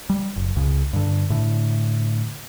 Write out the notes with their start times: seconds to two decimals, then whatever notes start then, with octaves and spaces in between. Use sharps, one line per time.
0.10 G3
0.36 F#1
0.56 C#2 C#3
0.93 G2 D3
1.30 A2 D3